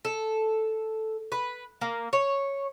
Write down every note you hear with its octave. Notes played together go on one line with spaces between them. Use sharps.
A4
B4
A#3
C#5